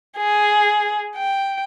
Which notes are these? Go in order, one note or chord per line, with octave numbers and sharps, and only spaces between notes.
G#4
G5